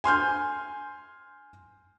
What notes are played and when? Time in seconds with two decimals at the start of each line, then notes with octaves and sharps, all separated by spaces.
0.04 G#5 C6 F6 G6